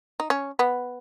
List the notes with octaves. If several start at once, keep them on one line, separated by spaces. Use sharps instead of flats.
D#4
C#4
B3